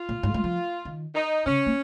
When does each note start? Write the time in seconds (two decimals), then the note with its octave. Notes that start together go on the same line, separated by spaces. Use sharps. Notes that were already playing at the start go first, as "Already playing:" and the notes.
Already playing: F4
0.09 A#2
0.23 G#2
0.34 G#3
0.44 F3
0.85 D#3
1.15 D#4
1.46 C#3 C#4
1.66 A#3